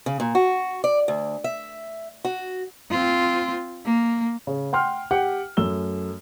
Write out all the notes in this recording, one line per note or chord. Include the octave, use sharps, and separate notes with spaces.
C#3
A#2
F#4
D5
D2
E5
F#4
C4 F4
A#3
C#3
F#5 G5 C6 F6
G4 F#5 G5
F#2 A3 E6 G7